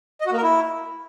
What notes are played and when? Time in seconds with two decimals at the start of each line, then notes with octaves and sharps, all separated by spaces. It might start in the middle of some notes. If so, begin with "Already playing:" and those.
0.21 D#5
0.26 F#4
0.32 A#3
0.37 A#4
0.43 E4